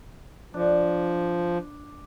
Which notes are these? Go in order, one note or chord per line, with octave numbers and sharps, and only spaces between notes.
F3 D4